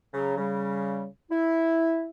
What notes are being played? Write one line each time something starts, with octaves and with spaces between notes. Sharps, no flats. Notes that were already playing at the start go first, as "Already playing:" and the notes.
C#3 F#3
C#3 G3
E4